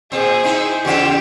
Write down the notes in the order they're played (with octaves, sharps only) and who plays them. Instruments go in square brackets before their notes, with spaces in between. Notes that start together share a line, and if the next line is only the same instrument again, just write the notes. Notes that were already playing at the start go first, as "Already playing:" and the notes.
[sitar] A#2 C4 [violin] G#4 C5
[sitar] C4 D#4 E4
[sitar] E2 C#3 F4 [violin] G4 E7